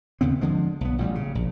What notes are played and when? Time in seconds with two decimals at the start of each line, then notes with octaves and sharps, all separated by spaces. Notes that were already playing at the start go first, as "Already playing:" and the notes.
0.21 D#2 C#3 B3 C4
0.41 D3 F3 G#3
0.81 B1 B3
0.98 A1 A#2 G3
1.15 C#3
1.35 A#1